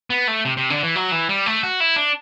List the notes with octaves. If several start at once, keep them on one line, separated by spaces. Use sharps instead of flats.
B3
A3
C3
C3
D3
E3
F#3
E3
G3
A3
F#4
E4
D4